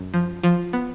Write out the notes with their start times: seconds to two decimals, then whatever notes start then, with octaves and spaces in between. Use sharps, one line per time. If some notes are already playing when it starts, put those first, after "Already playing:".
Already playing: F#2
0.14 F3
0.43 F3
0.73 B3